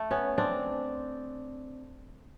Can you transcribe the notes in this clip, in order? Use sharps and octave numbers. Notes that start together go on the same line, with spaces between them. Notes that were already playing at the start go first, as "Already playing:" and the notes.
Already playing: A3
B3 C#4
C4 D4